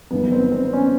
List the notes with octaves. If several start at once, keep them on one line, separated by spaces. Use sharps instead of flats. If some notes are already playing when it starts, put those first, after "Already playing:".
G1 G2 D#3 F#3 B3
C4
C4
C#4